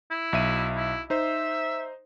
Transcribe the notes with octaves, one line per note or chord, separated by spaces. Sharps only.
E4
B1 E5 D#7
E4
D#4 C5 E5